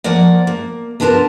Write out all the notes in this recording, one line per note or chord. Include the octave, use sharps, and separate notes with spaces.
F3 A#3 D5 F#5
A#3
B3 D4 E4 F4 A#4 A5